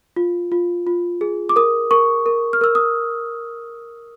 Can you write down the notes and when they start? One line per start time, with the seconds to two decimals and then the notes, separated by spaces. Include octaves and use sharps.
0.16 F4
0.52 F4
0.87 F4
1.21 G#4
1.49 D6
1.56 A#4 D#6
1.91 A#4 C#6
2.26 A#4
2.53 F6
2.61 A#4 E6
2.75 D#6